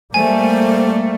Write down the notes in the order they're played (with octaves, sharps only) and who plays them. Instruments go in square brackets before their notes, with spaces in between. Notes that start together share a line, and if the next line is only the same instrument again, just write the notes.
[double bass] G3 A#3 [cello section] A3 [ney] C5 [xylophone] G#5